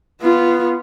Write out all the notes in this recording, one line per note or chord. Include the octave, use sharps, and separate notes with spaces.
B3 F4